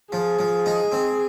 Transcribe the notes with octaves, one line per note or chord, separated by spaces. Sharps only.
F3 G#4
F3
D#4
C4